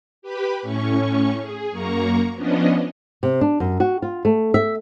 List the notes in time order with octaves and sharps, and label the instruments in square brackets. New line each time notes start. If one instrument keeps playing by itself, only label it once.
[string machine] G4 B4 B5
A2 C#4 C#6
G#4
F#2 A#3 A#5 C#6
F3 B3 C#4 D4 D#5
[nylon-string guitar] C3
D4
F#2
F#4
F4
A3
E5